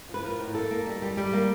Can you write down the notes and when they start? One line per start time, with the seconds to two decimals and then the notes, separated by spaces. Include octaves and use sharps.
0.09 F3
0.14 B4
0.24 F3 A#4
0.40 A2
0.55 A#3 A4
0.71 A#3
0.86 G3
1.02 G3
1.17 G3
1.33 A#3